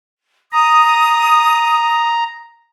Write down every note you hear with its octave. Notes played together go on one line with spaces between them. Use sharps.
A#5 D#6